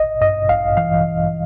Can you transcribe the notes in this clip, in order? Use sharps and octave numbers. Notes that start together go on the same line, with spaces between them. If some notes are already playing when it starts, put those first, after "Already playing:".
Already playing: A1 D#5
G2 D#5
A1 F5
E3 F5